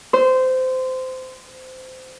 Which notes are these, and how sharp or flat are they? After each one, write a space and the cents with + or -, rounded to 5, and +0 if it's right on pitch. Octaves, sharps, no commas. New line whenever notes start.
C5 -20